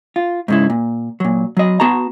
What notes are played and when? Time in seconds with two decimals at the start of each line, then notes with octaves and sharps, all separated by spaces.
0.16 F4
0.48 G#2 C#3 E4
0.70 A#2
1.20 A#2 F#3
1.57 F#3 D#5
1.80 B3 F#4 A5 A#5